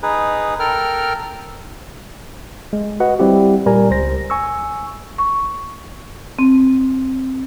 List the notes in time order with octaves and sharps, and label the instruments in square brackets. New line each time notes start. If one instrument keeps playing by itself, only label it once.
[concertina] D#4 G#4 B4
A4 A#4 G5 F6
[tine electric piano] G#3
F#4 B4 D#5 F#5
G3 C4 E4 G4
A#2 G3 A#4 G#5 A#5
C#2 C5 A#6
G#5 C#6 E6
[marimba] C#6
C4